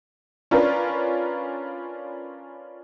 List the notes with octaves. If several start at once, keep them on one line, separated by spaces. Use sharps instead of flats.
C#4 D4 F4 A#4 B4